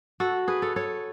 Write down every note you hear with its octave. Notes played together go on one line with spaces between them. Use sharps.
F#4 A4
G#4 B4
A4 C#5
A4 C#5